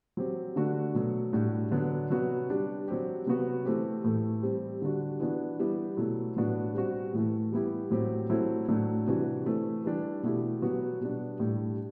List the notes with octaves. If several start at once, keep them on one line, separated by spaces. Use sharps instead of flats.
F#3 C4 G4
D3 A3 D4 F#4
B2 F#3 A3
A2 G3 D4 F#4
D3 F#3 B3 D4
C3 F#3 B3 F#4
G3 D4 G4
F#3 C4 G4
C3 F#3 B3 F#4
E3 A3 C4 G4
A2 E3 A3
G3 C4 G4
D3 G3 D4 F#4
E3 B3 D4 F#4
G3 B3 E4 G4
B2 F#3 A3 E4
A2 F#3 B3 D4 F#4
G3 C4 F#4
A2 E3 A3
G3 B3 E4 G4
A2 F#3 C4 G4
F#3 A3 C4 E4
A2 F#3 A3 D4
C3 E3 G3 D4 F#4
E3 A3 C4
E3 G3 D4 G4
B2 A3 E4 G4
F#3 B3 F#4
B2 G3 D4
A2 G3 D4